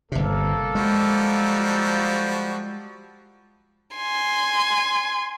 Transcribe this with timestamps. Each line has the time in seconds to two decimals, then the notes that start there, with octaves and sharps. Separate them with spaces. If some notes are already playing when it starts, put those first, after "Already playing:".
0.12 G1 C3 A#3 A4
0.75 F3 G3 G#3 F#4
3.95 G#5 C6